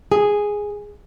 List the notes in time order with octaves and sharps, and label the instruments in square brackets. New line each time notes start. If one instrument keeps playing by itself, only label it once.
[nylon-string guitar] G#4